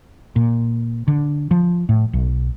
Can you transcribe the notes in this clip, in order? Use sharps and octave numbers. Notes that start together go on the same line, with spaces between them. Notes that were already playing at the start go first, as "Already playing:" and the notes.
A#2
D3
F3
A2
B1